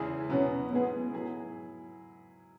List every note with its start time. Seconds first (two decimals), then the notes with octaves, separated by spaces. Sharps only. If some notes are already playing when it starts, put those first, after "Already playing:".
Already playing: E2 C#3 G#3 E4 G#4
0.30 B2 F#3 B3 C#4
0.71 G#2 G#3 B3 E4 G#4
1.13 F#3 E4 G#4